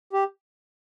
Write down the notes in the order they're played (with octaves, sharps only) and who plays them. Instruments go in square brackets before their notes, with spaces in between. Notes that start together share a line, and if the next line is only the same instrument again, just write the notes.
[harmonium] G4